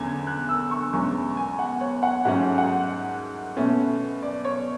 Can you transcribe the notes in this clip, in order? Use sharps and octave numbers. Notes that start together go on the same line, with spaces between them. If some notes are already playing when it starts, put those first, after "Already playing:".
Already playing: E2 D3 A3 C#4 G#6
F#6
E6
C#6
E2 B2 G#3 C#4 C#6
G#5
F#5
C#5
F#5
G#2 F#3 A3 C#4 F#5
F#5
B2 A3 C#4
D5
C#5